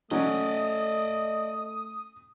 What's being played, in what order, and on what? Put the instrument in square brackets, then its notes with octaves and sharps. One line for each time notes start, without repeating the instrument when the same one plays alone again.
[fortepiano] F#3 C#4 F#4 [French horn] A3 [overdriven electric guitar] D5 D#5 [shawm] D#6